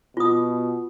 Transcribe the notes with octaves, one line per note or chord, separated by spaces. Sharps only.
B2 F4 D#6